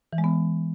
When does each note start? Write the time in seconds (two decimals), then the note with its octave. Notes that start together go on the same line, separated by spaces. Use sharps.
0.13 E3
0.18 G#3
0.24 B3